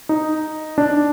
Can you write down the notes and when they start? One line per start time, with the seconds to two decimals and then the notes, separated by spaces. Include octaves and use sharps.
0.09 D#4
0.78 D4